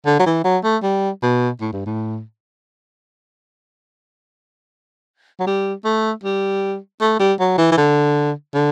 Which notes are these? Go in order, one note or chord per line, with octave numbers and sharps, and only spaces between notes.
D3
F#3
E3
F#3
A3
G3
B2
A2
G2
A2
F#3
G3
A3
G3
A3
G3
F#3
E3
E3
D3
D3